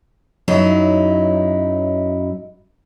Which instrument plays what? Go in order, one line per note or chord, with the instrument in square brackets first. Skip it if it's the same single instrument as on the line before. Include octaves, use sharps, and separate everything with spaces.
[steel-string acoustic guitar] F#2 F#3 D#4 E4